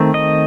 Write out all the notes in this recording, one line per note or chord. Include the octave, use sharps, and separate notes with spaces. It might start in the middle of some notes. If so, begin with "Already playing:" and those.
Already playing: D#3 A3 C4
D#5